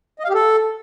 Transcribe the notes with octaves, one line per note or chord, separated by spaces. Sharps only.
D#5
F5
G4
A4